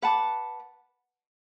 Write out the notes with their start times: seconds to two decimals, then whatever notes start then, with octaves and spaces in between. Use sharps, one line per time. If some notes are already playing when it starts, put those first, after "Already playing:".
0.02 B4 F#5 A5 D6